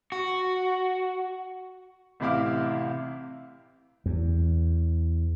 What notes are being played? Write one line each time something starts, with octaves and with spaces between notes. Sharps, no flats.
F#4
A1 C3 E4 E5 F5 D6
E2